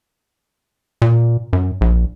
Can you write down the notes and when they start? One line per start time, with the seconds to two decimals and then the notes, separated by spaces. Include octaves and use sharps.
1.02 A#2
1.53 F#2
1.81 A#1